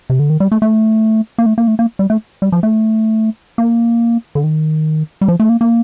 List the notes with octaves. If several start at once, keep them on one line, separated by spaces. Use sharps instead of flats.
C3
D3
D#3
G3
A3
A3
A#3
A3
A#3
A3
A#3
G3
A3
G3
F3
A3
A#3
D3
D#3
G3
F3
A3
A#3
A#3